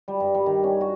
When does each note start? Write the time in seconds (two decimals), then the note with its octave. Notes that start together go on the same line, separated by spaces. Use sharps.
0.08 G3
0.20 G2
0.35 G3
0.46 D#3
0.64 C#4
0.81 F#4